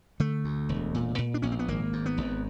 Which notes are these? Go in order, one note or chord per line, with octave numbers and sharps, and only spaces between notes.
D3 A3
D2
E1
A#2
A#2
D4
A#1 C#4
C4
B3
G#1 A#3
G#2
B3
G#1